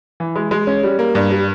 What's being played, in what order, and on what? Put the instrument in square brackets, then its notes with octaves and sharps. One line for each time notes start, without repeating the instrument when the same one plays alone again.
[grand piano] E3
G#3
G#3
C#4
G3
A#3
G2
G3